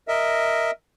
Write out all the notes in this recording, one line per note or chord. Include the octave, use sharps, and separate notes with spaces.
A#4 D#5 E5